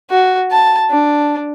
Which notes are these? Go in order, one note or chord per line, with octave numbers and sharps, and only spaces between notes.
F#4
A5
D4